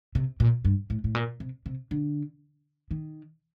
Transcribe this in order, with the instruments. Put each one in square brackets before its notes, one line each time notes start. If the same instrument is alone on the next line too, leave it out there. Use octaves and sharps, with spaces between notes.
[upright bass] C3
A#2
G2
A2
A2
A#2
C3
C3
D3
D#3